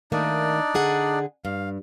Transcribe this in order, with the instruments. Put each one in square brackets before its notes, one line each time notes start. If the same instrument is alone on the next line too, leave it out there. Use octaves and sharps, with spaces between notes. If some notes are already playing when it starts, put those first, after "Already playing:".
[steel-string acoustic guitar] D#3 A3 A#3 [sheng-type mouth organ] D4 D#4 D5
[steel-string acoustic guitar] D3 G#4 F#5
[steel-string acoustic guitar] G2 [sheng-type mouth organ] F5